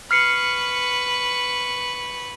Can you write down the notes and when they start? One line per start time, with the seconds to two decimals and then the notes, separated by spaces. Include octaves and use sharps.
0.11 B4 C#6 F6 C7 C#7